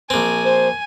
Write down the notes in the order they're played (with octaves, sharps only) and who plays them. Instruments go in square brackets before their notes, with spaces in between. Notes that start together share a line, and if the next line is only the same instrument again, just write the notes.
[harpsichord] A#1 C4 [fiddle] G#5
[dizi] C5